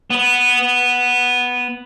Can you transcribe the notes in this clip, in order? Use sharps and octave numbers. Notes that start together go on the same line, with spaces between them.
B3 B4